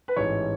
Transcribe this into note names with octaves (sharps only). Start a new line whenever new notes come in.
B4
A1 G#2 E3 C#5